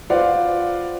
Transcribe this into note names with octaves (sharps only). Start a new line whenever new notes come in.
F4 B4 C5 D5 F5 F#5